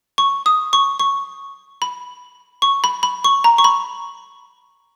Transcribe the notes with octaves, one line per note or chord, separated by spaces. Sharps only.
C#6
D#6
C#6
C#6
B5
C#6
B5
B5
C#6
A#5
C#6
B5